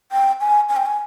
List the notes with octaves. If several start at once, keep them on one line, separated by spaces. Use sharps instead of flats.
G5
G#5
G#5
G5
G#5